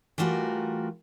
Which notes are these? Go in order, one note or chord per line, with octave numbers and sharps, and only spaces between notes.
E3 G3 A3 F4 F#4 A#4